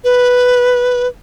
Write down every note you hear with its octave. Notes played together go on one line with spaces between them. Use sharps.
B4